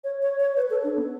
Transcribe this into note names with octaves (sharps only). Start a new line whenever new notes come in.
C#5
C#5
C#5
B4
A4
D4
B3